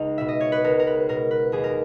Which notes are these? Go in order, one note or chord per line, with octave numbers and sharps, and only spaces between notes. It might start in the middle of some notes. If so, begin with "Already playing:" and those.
Already playing: C#2 D#4
B2 E5
D#5
C#5
B4
C#2 A#4
A#4
B4
B2 A#4
B4
D#2 G#4
A#4